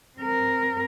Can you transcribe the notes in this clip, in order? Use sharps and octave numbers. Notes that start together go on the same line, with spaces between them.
C4 A#4